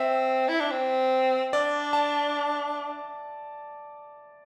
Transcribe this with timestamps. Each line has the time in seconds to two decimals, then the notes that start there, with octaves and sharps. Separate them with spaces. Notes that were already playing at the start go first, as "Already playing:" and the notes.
Already playing: C4 E5
0.49 E4
0.60 D4
0.71 C4
1.53 D4 D5
1.93 A5